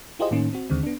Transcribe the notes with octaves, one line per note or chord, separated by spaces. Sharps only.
E4 F4 G4 G#4 C5 D#5
A2 D#3 A#3 C#4 D#4
C4 F#4
D#2 D3 D#3 G#3 C4
B3 D4